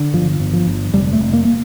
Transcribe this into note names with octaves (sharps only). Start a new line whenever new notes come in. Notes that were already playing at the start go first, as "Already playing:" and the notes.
Already playing: D3
G1 F3
G1
F3
G1
F1 G3
A3
F1
A#3
A#3